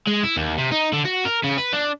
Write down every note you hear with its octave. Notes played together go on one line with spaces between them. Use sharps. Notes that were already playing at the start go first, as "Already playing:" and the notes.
G#3
E4
D#2
C3
D#4
D3
F#4
A#4
C#3
B4
D4